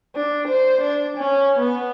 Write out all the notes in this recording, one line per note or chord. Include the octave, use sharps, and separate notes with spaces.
D4
C5
D4
C#4
B3